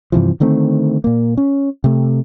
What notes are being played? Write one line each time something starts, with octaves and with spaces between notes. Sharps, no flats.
G2 C3 E3 F3
D3 D#3 A3 C4
A#2 A#3
C#4
C3 A3